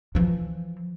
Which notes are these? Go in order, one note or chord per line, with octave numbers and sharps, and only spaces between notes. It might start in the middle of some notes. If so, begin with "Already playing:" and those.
E3 F3